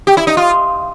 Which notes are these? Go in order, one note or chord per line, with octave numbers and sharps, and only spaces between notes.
G4
E4
D#4
F4